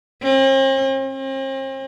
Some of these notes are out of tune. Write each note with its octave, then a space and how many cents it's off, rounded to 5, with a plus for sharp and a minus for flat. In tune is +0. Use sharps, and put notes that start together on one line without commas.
C4 +45
C4 +45